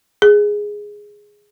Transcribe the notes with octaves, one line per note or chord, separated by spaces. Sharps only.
G#4